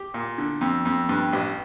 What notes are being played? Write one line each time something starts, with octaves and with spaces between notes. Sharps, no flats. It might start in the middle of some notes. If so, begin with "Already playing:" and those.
Already playing: G4
A#2
D3
F2
F2
G2
A1